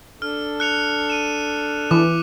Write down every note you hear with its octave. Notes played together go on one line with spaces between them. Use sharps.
D4 A4 F6
F#6 C#7 F7
D#7 E7
E3 D6